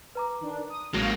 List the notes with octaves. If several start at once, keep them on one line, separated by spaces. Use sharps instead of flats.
B4 A#5 D6
D#3 D4
D#6
A1 G#3 A#3 F#4 C#5 F5